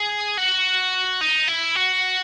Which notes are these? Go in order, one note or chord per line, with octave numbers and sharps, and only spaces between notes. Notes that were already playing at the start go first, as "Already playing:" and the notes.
Already playing: G#4
F#4
D#4
E4
F#4